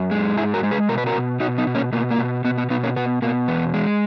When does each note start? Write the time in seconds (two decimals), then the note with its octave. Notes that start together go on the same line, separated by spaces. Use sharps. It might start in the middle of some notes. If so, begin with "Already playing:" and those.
Already playing: F#2
0.11 G#3
0.36 G#2 E4 G#4
0.54 F#4 A#4
0.63 G#3
0.71 G#4 B4
0.89 B2 A#4
0.98 B4
1.06 F#4 A#4
1.15 B2
1.40 B2 D#4 F#4
1.58 B3 D#4
1.67 B2
1.75 A#3 C#4
1.92 B2 A#3
2.11 A#3
2.18 B2
2.44 B2 B3
2.58 B3
2.70 B2 B3 D#4
2.83 A#3 C#4
2.96 B2 B3
3.22 B2 A#3
3.48 E2 B3
3.74 G#3